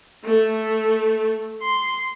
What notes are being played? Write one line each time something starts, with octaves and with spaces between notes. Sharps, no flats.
A3
C6